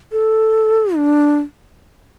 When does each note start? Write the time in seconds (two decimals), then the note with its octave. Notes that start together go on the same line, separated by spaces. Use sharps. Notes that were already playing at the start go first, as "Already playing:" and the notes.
0.12 A4
0.95 D4